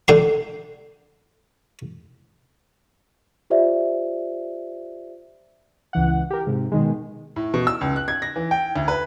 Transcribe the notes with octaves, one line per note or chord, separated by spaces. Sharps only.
D3 G5 C6
F4 G4 C5 D5 E5
C#2 E3 F#5
G4 A#4
G#2 C3
B2 D#3 G#3
A2
B2
E6
C#2
F#6
G#6
A#6
E3
G5
D2
B4